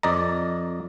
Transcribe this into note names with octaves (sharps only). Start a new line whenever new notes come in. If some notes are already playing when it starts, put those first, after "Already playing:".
F2 D5 D#5 A#5